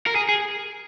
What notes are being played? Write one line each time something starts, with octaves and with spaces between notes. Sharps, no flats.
A#4
G#4
G#4